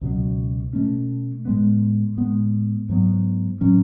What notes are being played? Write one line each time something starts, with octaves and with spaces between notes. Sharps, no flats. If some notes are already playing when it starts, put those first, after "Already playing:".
C#2 B2 F#3
B2 A3 C#4
A2 G#3 B3
A2 G#3 B3
G#2 F#3 B3
A2 F#3 C#4